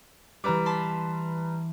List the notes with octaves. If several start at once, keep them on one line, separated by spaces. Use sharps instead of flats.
E3 G3 B4 A#5 D6
A5 B5 C6